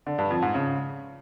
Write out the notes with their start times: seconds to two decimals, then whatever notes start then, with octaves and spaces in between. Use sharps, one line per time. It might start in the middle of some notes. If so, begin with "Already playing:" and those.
0.07 D3
0.18 G2
0.30 F2
0.42 G#2
0.54 C#3